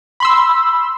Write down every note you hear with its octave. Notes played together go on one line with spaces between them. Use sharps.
B5 C6 E6